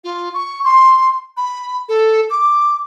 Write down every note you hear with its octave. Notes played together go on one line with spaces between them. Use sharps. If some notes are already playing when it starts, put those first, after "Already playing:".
F4
C#6
C6
B5
A4
D6